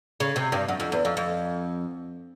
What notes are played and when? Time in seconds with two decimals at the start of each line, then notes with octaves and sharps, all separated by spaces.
0.20 C#3
0.36 C3
0.52 G2
0.68 F#2
0.80 F2
0.92 E2
1.05 F2
1.17 F2